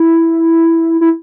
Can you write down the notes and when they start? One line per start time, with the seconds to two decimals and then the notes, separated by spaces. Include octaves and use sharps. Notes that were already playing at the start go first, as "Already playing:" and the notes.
Already playing: E4
1.01 E4